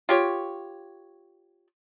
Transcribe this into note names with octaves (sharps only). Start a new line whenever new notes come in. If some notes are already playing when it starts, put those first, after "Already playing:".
F4 G4 C#5